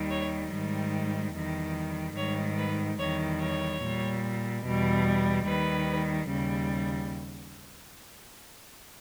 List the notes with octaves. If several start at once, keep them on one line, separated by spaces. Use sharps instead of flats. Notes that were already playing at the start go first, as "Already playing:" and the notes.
Already playing: D#2 D#3 G3
C#5
G#2 D#3 G3
E2 D#3 G3
G#2 D#3 G3 C#5
B4
E2 D#3 G3 C#5
C#5
A#2 G3
E2 B2 G3
D#2 D#3 G3 B4
D#2 C#3 G3